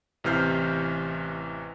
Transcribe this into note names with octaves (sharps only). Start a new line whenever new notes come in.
A1 C3 E3 F6 G6 C7